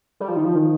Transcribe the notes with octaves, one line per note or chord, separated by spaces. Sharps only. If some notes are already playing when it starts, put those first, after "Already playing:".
G3
F3
D#3
F3
D#3